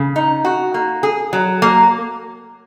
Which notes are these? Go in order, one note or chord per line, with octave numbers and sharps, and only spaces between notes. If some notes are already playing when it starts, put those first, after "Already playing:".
Already playing: C#3
D#4
F#4
A#3
G#4
F#3
A#3